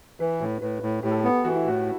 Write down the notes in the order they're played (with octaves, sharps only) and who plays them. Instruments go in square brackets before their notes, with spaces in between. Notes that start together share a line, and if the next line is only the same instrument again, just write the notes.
[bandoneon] E3 [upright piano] B4
[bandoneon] A2
[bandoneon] A2 [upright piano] B4
[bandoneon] A2
[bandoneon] A2 [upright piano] G4
[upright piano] A4
[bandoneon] B3 [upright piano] G4
[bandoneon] E3 [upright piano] F#4
[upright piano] E4
[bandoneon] A2 [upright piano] F#4